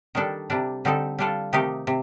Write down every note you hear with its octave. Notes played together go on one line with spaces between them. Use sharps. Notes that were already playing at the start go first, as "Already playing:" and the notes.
D#3 G3 D4 A4
C3 G3 D4
D3 G3 C4 D#4 A4
G3 D4 F4 A4
C3 D#3 A3 D#4 G4
C3